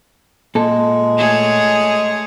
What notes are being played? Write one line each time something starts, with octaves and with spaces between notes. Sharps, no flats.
A#2 G#3 A4
A3 G#4 C#5